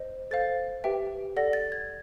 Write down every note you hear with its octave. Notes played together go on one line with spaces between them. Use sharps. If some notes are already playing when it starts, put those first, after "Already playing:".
Already playing: C5 D#5
A4 C5 F5 A6
G4 B4 E5 G5
A4 D5 F#5 A#6
A6
G#6